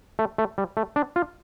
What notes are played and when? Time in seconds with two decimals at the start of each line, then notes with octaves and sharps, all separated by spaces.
0.19 A3
0.38 A3
0.58 G3
0.77 A3
0.96 D4
1.16 F4